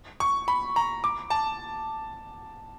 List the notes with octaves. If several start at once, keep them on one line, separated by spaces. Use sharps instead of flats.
C#6
B5
A#5
D6
A5